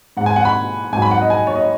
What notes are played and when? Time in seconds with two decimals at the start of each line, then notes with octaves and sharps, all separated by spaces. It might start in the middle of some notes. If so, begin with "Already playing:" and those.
0.17 G#2 F#5
0.21 G#3
0.26 G#5
0.36 F#5
0.45 B5
0.93 G#2 G#5
0.97 F#3
1.02 B5
1.11 F#5
1.21 D#5
1.30 G#5
1.47 C#5
1.56 D#5